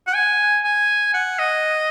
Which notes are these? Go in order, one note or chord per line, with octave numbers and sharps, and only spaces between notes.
F#5
G#5
G#5
F#5
D#5